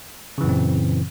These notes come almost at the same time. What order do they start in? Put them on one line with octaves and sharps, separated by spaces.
C#3 E3 F#2 A#2 C4